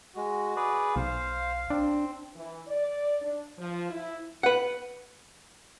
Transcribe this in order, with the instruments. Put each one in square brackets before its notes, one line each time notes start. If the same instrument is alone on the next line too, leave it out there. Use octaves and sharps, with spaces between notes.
[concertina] G#3 [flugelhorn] F#4
[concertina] G#4 B4 D5
[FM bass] B1 [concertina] C5 [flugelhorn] F5
[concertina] C4 [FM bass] D4
[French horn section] E3
D5
D4
F3
E4
[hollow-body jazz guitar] B4 F#5